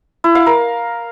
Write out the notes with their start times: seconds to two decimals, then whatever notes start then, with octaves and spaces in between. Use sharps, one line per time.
0.24 E4
0.35 F5
0.46 A#4